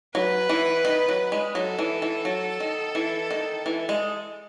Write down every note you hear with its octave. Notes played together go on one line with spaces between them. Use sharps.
F#3 B4
E3
D#3
F#3
G#3
F#3 A4
E3
E3
F#3
D#3
E3
D#3
E3
G#3